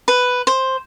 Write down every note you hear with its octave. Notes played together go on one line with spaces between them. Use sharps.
B4
C5